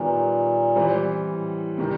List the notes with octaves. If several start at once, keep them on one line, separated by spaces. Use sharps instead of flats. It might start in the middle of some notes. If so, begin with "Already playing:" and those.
Already playing: A#2 D#3 G3 B3
E3 G3 C4
A2
C3 D#3 G3